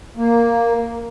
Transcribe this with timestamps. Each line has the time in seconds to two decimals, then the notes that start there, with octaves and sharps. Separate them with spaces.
0.17 A#3